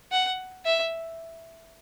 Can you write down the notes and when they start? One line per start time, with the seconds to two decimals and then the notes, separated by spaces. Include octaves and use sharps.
0.12 F#5
0.65 E5